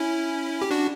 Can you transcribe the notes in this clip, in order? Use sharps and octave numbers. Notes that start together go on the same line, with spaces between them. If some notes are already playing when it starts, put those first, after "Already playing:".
Already playing: C#4 E4
G4
D4 F#4